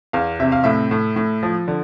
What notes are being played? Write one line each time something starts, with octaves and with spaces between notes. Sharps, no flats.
E2 F5
C3 E5
F5
A2 E5
A2
A2
F3
D3